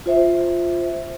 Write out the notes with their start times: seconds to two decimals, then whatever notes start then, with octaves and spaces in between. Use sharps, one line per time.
0.06 F4 C5 E5